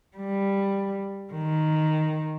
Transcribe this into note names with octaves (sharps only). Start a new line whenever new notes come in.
G3
D#3